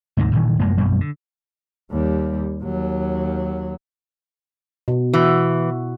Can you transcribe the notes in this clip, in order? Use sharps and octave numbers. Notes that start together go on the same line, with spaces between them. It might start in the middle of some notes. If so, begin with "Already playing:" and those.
D2 G#2 C3 D#3
F#1 A#2 D#3 E3
F1 F#2 G#3 A#3
A#1 F#2 B2 G3
D3
D#2 G3
D#2 F#3
B2
E3 F#4